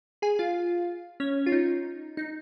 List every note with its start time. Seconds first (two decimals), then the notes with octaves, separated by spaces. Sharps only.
0.22 G#4 G#5
0.39 F4 F5
1.20 C#4 C#5
1.46 F4
1.52 D#4
2.17 D#4